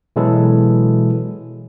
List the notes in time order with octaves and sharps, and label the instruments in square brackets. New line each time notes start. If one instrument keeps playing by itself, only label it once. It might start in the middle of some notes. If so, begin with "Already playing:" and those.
[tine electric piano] B2 E3 F#3 G#3 E4 A4